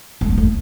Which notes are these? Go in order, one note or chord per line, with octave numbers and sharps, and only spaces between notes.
A3
B3
A3